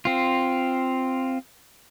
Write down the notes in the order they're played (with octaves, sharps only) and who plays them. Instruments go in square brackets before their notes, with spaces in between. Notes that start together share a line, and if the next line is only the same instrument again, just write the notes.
[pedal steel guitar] C4 F4